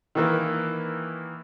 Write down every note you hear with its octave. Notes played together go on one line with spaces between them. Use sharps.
D#3 E3 A#3